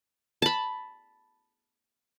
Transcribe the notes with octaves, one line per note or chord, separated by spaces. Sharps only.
A5 B5